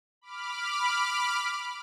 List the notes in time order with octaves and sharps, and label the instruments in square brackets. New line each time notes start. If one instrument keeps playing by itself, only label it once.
[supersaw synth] B5 D6 F6